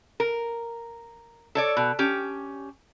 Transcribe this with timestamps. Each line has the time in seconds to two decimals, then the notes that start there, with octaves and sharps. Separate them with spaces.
0.20 A#4
1.55 A4 C#5 D5
1.77 B2
1.99 C#4 G4